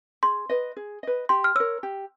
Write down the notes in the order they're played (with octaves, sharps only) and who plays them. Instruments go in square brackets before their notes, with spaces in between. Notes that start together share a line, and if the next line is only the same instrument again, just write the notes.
[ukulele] G#4 [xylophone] C6
[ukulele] B4 D#5
G#4
B4 D#5
[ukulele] G4 [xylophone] C6
[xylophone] F6
[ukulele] A#4 C#5 [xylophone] E6
[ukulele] G4